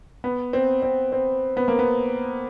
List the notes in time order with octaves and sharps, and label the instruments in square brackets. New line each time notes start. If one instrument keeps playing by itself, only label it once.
[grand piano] B3
C4
C4
C4
B3
A#3
B3